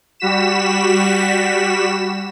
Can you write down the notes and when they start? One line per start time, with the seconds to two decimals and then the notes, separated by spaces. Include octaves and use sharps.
0.20 G3 F#4 B6 E7